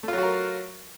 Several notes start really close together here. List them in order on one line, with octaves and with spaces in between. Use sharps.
A3 F4 F#3 F#4 A#4